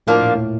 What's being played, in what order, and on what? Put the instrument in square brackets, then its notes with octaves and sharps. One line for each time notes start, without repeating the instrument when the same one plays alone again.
[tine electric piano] A2 [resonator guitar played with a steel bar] F3 A#3 D4
[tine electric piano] A#2
A2